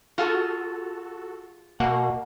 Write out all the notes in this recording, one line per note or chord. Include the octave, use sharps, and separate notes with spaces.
F4 F#4 G#4 A4
B2 A#3 F#5